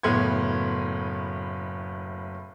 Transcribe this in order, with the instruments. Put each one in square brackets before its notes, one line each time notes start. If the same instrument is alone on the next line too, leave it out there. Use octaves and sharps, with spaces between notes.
[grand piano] F#1 A2 B3 C6 G#6